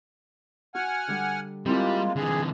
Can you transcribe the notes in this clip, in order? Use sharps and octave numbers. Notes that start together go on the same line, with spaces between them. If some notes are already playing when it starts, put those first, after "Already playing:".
F#4 F#5 G#5 F6
D3 G3
G3 G#3 A#3 C4 E4 F4
D3 E3 G#4